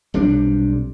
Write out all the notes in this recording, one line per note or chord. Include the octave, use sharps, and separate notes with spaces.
B1 C3 G3 D4